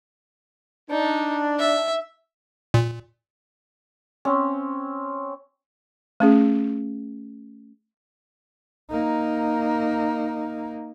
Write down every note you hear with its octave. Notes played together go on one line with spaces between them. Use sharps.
D4 D#4
E5
A#2
C4 C#4
A3 C#4 G#4
A#3 D#4